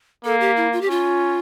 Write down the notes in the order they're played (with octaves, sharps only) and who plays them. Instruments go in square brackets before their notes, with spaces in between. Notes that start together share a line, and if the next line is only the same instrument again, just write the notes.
[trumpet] A#3 [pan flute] A4
[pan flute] G4
E4
F4
G4
[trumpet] C#4 [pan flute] F4